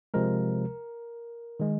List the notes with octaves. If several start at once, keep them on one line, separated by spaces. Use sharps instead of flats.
C3 F3 G#3 A#4
D#3 G#3